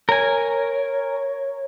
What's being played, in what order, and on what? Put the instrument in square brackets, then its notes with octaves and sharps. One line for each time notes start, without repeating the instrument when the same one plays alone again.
[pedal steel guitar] A#4 G#5 [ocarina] C#5